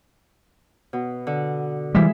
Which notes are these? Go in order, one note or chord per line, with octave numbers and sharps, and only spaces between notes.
B2
D3
E3 G3 G#3 E4 E5